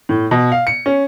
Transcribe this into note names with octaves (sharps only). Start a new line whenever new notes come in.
A2
B2
F5
C#7
C#4